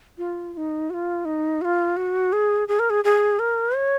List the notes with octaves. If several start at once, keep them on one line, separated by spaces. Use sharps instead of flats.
F4
F4
D#4
F#4
F4
D#4
F#4
F4
F#4
G#4
G#4
A#4
G#4
G#4
A#4
C#5